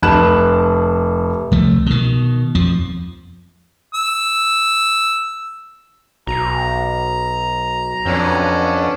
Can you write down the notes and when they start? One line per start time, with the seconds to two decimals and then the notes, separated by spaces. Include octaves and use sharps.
0.02 F1 A5 B5 F#6 E7
1.52 C2 F3 A3
1.86 B2 D#3
2.55 F2 F3
3.94 E6
6.27 B1 F#3 A#5
8.06 F2 B3 C#4 D4